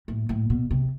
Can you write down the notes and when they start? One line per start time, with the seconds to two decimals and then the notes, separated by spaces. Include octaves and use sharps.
0.08 A2
0.29 A2
0.50 B2
0.71 C3